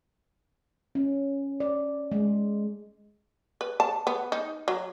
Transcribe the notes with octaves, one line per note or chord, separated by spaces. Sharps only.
C#4
D5
G#3
B4
A5
B3
D#4
F#3